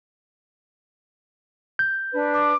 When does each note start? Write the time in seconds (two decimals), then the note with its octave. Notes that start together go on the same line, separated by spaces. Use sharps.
1.79 G6
2.11 D4 B4
2.34 D6